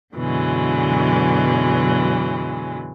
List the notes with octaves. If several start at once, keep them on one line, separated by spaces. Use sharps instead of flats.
F#2 B2 D3 E3 F#3 G#3